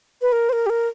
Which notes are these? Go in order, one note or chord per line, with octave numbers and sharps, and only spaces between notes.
B4
A#4
C5
A#4
G4
A#4